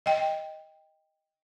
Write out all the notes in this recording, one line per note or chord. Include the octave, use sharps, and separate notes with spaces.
D#5 G5